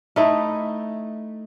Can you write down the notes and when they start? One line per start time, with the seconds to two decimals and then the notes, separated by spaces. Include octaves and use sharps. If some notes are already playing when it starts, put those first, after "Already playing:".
0.16 A3 D#4 E4